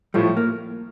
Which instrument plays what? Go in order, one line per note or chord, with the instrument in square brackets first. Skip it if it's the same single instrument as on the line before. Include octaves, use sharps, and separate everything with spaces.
[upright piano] A2 F3 A3 [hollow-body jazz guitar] G3
[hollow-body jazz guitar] A#3